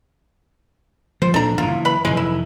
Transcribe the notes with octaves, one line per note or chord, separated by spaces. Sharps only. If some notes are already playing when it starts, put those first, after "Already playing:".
F3 C5
A#1 C#4 D4 A4 A#5
F#1 E3 F4
B4 B5
F1 C#2 E3 G#3
E4